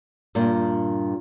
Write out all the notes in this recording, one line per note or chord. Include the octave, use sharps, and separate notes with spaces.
G2 A#2